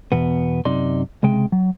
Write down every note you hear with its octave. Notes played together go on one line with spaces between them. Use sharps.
E2 B2 B3
F#2 C3 D#4 D5 C6
C#2 C3 G#3 G5
F#3